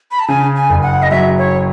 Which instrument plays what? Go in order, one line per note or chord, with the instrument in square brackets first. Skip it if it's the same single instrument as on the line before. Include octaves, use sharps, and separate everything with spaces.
[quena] B5
A5
[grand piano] C#3 [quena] G#5
[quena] G#5
[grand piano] F#1
[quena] F#5
D#5
[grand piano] F#3 [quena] E5
[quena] C#5